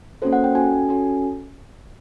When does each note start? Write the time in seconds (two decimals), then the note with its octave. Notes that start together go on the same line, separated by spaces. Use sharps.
0.22 A#3 C#4 F#4 A4 C5
0.33 F#5
0.44 G5
0.55 C#4 F#4 A4 G#5
0.89 C#4 F#4 A4